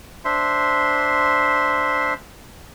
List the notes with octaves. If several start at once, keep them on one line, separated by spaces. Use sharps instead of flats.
D4 C5 E5 C6